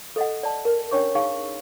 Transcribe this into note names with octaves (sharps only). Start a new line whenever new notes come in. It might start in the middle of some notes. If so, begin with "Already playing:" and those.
A4 D#5 F#5
D5 A5
A#4
C#4 D4 C#5 C#6 D6
D#4 G#4 F5 C#6